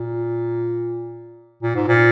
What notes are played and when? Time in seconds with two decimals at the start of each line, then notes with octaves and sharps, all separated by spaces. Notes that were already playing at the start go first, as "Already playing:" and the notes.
Already playing: A#2
1.62 A#2
1.76 G#2
1.88 A#2